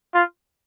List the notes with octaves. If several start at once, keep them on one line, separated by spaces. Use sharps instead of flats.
F4